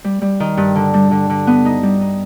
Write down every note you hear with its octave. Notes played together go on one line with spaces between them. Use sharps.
G3
G3
D#3
G2
D3
G3
D3
D3
B3
D#4
G3
D#4